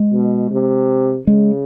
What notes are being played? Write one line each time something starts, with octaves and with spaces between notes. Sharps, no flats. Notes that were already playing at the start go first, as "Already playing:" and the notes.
Already playing: G#3
B2
C3
C#3 G#3